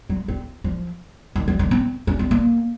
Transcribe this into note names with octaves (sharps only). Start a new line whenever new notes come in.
F#3
C4
F3
D#3
F3
D#3
C4
C#4
C4
A#3